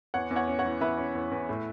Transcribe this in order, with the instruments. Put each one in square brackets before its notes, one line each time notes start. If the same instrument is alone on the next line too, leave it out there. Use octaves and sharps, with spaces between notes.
[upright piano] E2 C#5 F#5
E2
C#5 F#5
C#4
C#5 F#5
E3
E2 B4 E5
C#4
E2
E2
A2